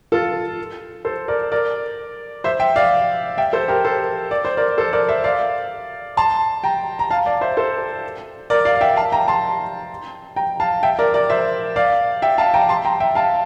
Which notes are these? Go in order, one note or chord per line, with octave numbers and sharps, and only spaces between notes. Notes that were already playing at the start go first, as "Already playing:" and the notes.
F4 A4
A4 C5
A#4 D5
A#4 D5
C5 E5
E5 G5
D5 F5
E5 G5
A4 C5
G4 A#4
A4 C5
D5
C5
A#4 D5
A4 C5
A#4 D5
C5 E5
D5 F5
A5 C6
G5 A#5
A#5
F5 A5
D5 F5
C5 E5
A4 C5
A#4 D5
D5 F5
F5
E5 G5
F5 A5
G5 A#5
A5 C6
G5 A#5
F5 A5
E5 G5
A#4 D5
A#4 D5
C5 E5
D5 F5
E5 G5
F5 A5
G5 A#5
A5 C6
G5 A#5
E5 G5
F5 A5